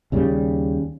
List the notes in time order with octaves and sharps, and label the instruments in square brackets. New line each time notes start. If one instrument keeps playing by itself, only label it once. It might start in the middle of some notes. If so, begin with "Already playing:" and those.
[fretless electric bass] D#2 C#3 G3